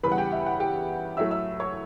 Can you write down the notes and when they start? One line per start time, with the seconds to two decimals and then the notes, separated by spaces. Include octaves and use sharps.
0.03 E2 C#3 G3 B4 B5
0.12 F#5
0.18 G4 G5
0.32 E5
0.46 F#5
0.60 G4 G5
1.17 A2 F#3 A3 E5 E6
1.31 E5 E6
1.60 C#5 C#6